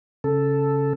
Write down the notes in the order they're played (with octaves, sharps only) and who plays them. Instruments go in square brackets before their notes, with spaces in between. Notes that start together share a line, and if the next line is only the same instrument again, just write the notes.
[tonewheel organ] C#3 A4